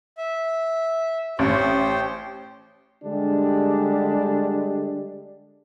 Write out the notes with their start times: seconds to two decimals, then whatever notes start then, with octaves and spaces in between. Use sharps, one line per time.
0.18 E5
1.39 A1 G4 C5 G5
3.03 D3 G3 G#3 D4 G4